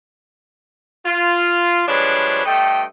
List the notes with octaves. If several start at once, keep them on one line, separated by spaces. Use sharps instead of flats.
F4
F3 G3 G#3 D4 B4 C#5
G2 A3 A4 D#5 G5